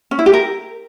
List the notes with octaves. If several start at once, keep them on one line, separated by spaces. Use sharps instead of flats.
C#4
E4
G4
A#4